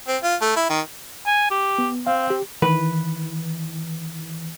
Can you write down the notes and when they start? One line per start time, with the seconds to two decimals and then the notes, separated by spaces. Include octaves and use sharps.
0.08 C4
0.23 F4
0.41 A3
0.56 E4
0.70 D#3
1.26 G#5
1.50 G4
1.78 B3
2.07 C4 F5
2.30 G4
2.62 D#3 E3 B4